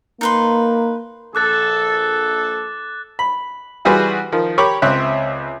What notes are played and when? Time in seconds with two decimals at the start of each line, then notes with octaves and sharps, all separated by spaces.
0.21 A#3 D#4 B4 C6
1.35 A#1 A4 D6 F#6 A6
3.19 B5
3.85 E3 G3 F#4 G#4 B4 C6
4.32 D#3 F3
4.58 G4 A#4 C#5 B5 C#6 D6
4.82 C#2 C4 C#5 E5 F#6